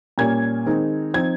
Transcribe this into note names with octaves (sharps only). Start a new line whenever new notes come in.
A#2 G3 A#3 C#4 G#6
D#3 G#3 C4 D#4
F3 C4 D#4 G#6